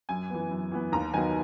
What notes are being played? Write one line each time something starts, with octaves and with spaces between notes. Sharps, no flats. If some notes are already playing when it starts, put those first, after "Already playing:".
F#2 G#5
E3 B3
F#2
E3 B3
D#2 A#5
D#3 F#3 B3 G#5